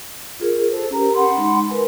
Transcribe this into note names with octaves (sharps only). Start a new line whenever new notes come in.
F4 G#4 A#4
A4 C5
C#4 G4 A#4 A#5
F#5 B5 C6
G#3 D#4
A#4 B4 G#5